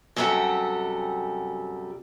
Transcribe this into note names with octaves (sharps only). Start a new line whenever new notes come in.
F#2 C3 G3 A4 F#5